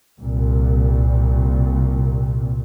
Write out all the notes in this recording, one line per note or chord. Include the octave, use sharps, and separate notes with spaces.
C2 A#2